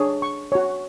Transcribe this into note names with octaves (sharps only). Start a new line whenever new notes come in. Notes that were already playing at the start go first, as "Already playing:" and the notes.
Already playing: D4 G#4 C#5
C#6
F#4 C#5